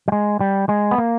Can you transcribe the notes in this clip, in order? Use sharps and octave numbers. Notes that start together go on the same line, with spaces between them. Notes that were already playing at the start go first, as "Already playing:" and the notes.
G3
G#3
G3
G#3
B3
A#3